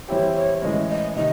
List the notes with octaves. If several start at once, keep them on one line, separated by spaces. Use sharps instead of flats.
E3 G3 C4 E4 G4 C#5
C#5
A2 E3 G#3 C#4 D#5
D#5
C3 D#3 D#5